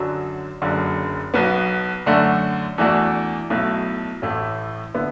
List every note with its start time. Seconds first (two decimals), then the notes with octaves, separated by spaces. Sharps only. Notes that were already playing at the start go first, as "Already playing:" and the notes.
Already playing: F#2 D3 F#3
0.62 F#1 F#2 D3
1.34 B1 B2 B3
2.06 F#2 D3 A3 D4 F#4
2.78 E2 E3 A3 D4 F#4
3.50 B1 B2 A3 E4
4.22 A1 A2 A3 E4
4.94 D3 B3 E4